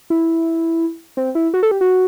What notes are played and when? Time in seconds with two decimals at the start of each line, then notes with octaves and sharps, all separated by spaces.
0.10 E4
1.17 C4
1.35 E4
1.54 F#4
1.63 A4
1.71 G4
1.81 F#4